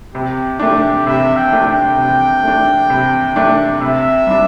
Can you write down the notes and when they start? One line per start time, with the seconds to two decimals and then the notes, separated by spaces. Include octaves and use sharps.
0.14 C3 G4
0.59 A3 D4 G4
1.06 C3 E5
1.37 G5
1.52 A3 D4
1.67 G5
1.98 C3
2.44 A3 D4
2.90 C3
3.36 A3 D4
3.81 C3 E5
4.27 G3 D4